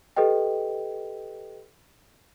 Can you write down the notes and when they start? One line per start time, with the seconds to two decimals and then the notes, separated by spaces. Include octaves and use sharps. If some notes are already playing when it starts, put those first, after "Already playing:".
0.16 G4 A4 B4 D#5 G5